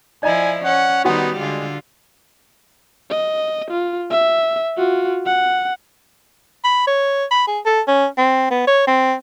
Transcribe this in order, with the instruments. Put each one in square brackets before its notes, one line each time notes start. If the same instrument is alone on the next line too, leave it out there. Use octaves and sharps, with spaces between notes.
[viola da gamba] F3 E4 [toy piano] D5 D#5 A#5 [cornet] G#5
[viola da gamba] C#4 [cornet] F#5
[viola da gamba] D#3 G3 D#4 [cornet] B3 [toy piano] F#4 F#5
[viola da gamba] D3 F4 [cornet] G#3
[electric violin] D#5
F4
E5
F4 F#4
F#5
[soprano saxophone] B5
C#5
B5
G#4
A4
C#4
C4
B3
C#5
C4